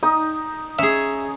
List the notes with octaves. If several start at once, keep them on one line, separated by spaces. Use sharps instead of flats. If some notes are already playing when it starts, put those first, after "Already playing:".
D#4 D#6
C#4 G#4 E5